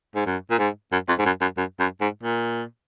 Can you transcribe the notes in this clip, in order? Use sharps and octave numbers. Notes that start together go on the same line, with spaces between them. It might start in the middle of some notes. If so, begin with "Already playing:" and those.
G#2
F#2
A#2
G#2
F#2
F2
G#2
F#2
F#2
F#2
F#2
G#2
A#2